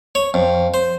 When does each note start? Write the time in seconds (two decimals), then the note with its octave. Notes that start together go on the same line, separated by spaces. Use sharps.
0.15 C#5
0.34 F2
0.74 C5